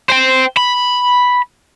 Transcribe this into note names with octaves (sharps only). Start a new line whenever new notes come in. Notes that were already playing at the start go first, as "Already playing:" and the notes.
C5 G5
B5